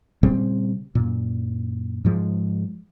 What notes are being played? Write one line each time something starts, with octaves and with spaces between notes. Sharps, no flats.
A#2 C#3 G3 C4
F#2 A#2
G#2 F3 G#3